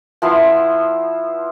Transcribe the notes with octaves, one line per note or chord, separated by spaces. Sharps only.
F3 B3 E4 C6